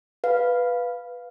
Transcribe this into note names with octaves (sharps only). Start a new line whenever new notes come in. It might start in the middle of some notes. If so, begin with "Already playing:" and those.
B4 F5